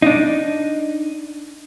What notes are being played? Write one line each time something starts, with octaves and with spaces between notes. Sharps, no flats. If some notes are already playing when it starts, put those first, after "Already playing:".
D4 D#4